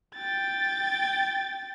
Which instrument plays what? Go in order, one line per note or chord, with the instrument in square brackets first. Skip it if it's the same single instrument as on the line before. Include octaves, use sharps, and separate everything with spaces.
[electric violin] G5 A6